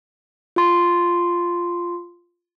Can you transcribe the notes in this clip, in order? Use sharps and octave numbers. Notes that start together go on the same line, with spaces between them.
F4 C6